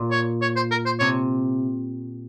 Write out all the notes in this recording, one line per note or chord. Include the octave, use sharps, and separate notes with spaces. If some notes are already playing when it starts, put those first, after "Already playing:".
Already playing: A#2
C#5
C#5
C5
A#4
C5
C3 C#5